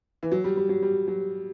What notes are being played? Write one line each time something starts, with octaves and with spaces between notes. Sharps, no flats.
E3
F#3
G3
G3
F#3
G3
F#3